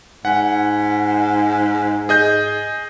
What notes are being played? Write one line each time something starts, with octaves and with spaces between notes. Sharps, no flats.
G#2 F#5
G#4 D#5 G6